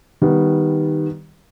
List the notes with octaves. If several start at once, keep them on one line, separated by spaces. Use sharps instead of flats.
D#3 G3 B3